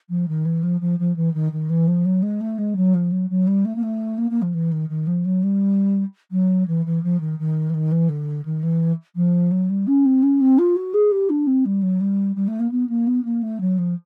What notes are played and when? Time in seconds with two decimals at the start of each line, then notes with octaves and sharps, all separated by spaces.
0.09 F3
0.28 D#3
0.45 E3
0.63 F3
0.80 F3
0.99 F3
1.16 E3
1.33 D#3
1.52 D#3
1.69 E3
1.87 F3
2.05 F#3
2.22 G#3
2.40 A3
2.58 G#3
2.76 F#3
2.94 F3
3.11 F#3
3.29 F#3
3.47 G3
3.65 A3
3.76 A#3
3.82 A3
4.18 A#3
4.30 A#3
4.42 F3
4.54 E3
4.71 D#3
4.89 D#3
5.06 F3
5.25 F#3
5.43 G3
6.31 F#3
6.67 E3
6.85 E3
7.03 F3
7.20 D#3
7.39 D#3
7.69 E3
7.74 D#3
7.91 E3
8.09 D3
8.45 D#3
8.63 E3
9.15 F3
9.51 F#3
9.69 G3
9.87 C#4
10.05 C4
10.22 C#4
10.40 C4
10.58 F4
10.76 F#4
10.93 G#4
11.11 G4
11.29 D4
11.47 C4
11.65 G3
11.82 F#3
12.00 G3
12.35 G3
12.47 A3
12.59 A#3
12.71 B3
12.89 A#3
13.07 B3
13.25 A#3
13.42 A3
13.60 F#3
13.78 F3